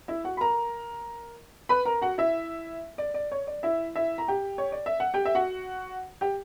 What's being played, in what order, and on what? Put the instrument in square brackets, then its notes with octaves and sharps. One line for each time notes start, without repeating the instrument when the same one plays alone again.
[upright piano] E4 E5
F#4 F#5
B5
A#4 A#5
B4 B5
A#4 A#5
F#4 F#5
E4 E5
D5
D5
C#5
D5
E4 E5
E4 E5
A#5
G4 G5
C#5
D5
E5
F#5
G4 G5
E5
F#4 F#5
G4 G5